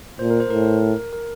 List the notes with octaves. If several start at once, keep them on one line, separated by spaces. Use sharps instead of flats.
A#2 C5
A#4
C5
A2 A#4
A#4